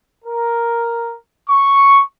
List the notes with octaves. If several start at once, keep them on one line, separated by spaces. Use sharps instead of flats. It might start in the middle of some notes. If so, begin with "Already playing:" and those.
A#4
C#6